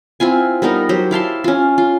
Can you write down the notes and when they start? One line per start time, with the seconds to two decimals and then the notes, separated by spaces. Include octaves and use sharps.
0.20 C4 E4 F4 G#5
0.62 G3 B3 D#4 A#4
0.89 F#3 G4 C5
1.11 E4 F5 A5 C6
1.44 C#4 F4
1.78 F4